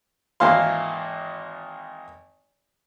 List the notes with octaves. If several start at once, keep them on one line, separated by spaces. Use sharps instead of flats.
G#1 E3 A#3 F5 C6